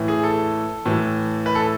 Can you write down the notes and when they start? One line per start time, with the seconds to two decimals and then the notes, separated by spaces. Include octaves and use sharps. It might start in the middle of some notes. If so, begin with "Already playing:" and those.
Already playing: A2 E3
0.08 G#4
0.23 A4
0.86 A2 E3
1.46 B4
1.55 A4